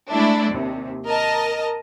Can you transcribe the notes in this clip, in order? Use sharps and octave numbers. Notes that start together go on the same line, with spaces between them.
G#3 A3 D4 E4
D#2 C3
A#4 D#5 A5